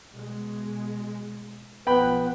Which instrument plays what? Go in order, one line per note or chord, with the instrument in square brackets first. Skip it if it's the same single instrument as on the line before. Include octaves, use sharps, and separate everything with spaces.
[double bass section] B2 G#3
[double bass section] B1 F3 [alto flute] B3 [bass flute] B4 [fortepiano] G5 B5